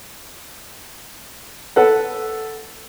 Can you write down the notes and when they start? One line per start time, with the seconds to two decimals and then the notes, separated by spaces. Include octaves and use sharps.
1.76 A4 B4 F#5